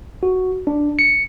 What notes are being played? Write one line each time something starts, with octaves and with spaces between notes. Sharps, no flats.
F#4
D4
C#7